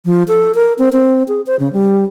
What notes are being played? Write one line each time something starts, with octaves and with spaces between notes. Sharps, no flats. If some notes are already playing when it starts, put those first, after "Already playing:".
F3
A4
A#4
C4
C4
G#4
C5
C#3
G3